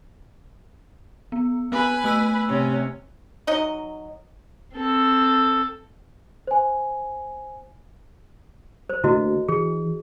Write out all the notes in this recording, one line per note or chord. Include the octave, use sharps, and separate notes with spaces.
B3
B3 B4 G#5 B5
A3 E6 F#6
C3 C#4
F#3 D#4 D#5
C4 A4
C5 G#5
C5
D3 A3 A#3 E4 F#4 D#5
E3 G#4